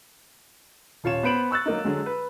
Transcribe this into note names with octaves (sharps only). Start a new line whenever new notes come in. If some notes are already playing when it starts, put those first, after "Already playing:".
D#1 F4 C#5 E7
B3 C5 B5 D7 E7 F#7
C#6 E6 F#6 A6
F#3 A#3 D#4
D3 F#3 G#3
B4